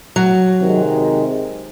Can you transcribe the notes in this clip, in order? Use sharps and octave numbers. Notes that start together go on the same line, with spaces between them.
F#3
C3 D#3 G#3